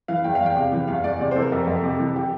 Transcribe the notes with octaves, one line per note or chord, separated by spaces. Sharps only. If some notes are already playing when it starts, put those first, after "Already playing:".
E3 F5
E2 G5
F5
E2
G5
C3 F5
E3
E2 F5
E2 D5
C3 D5
E3 A4 C5
A#4
F2 A4
F2
C3
E3
G4